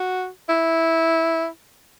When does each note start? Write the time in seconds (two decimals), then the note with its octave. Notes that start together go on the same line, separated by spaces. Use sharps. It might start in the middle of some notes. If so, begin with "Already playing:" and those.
Already playing: F#4
0.49 E4